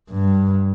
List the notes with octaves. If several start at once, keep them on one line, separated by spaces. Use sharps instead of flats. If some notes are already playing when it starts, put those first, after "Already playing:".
G2